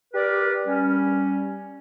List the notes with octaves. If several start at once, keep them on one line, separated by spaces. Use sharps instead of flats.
G4 A#4 B4 D5
G3 C#4